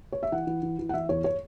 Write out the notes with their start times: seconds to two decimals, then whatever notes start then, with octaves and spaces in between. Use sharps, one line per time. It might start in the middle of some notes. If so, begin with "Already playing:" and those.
0.12 C#5
0.23 E5
0.32 E3 F#5
0.47 E3
0.63 E3
0.79 E3
0.89 F#5
0.94 E3 E5
1.09 E2 C#5
1.24 C#5